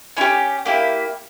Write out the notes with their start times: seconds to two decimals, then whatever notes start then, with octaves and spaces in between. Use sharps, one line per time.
0.17 C#4 E4
0.21 G4
0.66 A#3 E4 G4